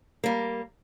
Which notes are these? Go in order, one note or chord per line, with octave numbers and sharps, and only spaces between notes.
G3 A#3